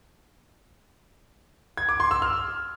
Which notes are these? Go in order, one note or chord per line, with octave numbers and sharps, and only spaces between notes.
G#6
D6
C6
E6
F6